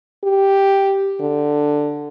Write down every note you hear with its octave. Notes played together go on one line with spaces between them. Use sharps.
G4
D3